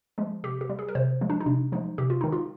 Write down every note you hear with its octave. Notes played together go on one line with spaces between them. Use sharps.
F3 G#3
C3 G4
G4
G3
G#4
A#4
C3 C5
F3 G#3
D4
D#4
C3 D4
F3 G#3 D#4
C3 G4
F4
D#3 G#3 D#4
F4